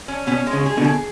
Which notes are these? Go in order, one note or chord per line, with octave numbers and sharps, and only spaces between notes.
C#4
B2 C#4
G#3
C#3
G#4
B2 D3
G#4